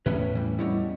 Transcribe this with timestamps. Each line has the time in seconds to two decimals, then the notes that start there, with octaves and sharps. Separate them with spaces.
0.06 E2 A2 C#4 B4 C#5 E5
0.35 E3 G3
0.59 B2 G3 C#4 E4